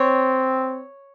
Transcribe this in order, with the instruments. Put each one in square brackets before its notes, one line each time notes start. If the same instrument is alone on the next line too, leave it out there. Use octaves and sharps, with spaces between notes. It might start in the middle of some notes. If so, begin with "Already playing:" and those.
Already playing: [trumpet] C4 [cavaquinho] C#5